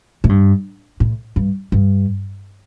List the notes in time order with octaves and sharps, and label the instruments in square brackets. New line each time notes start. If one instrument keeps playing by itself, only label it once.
[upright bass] A2
G2
A2
G2
G2